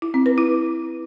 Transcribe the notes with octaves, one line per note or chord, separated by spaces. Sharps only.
E4
C4
B4
E4